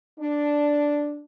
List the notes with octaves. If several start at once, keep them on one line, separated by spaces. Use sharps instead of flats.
D4